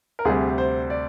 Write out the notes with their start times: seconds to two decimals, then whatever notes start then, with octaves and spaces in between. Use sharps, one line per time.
0.19 A#4
0.25 D2 C3 G3 G#4
0.58 C5
0.90 D5